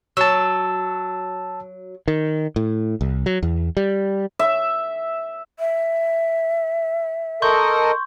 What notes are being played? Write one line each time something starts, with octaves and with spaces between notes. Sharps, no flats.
F#3 A5 E6
D#3
A2
C2
F#3
E2
G3
E5
E5
A4 A#4 D#5 C6 C#6 G6